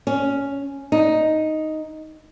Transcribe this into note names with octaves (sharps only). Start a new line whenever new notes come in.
C#4
D#4